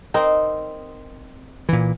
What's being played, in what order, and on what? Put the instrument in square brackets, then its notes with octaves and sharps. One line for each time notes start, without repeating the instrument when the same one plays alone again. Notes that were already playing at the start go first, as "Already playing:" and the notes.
[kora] C4 D#4 A#4
[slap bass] A#2 E3